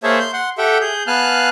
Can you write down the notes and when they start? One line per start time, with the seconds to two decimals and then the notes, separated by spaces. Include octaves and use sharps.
0.03 A#3 G#4 C5 C#5 E5 A5
0.20 C6 G6
0.33 F#5 C6
0.58 G4 A4 E5 F#5 G5
0.81 G#4 G6
1.07 B3 F5 G#5 A5 F6 F#6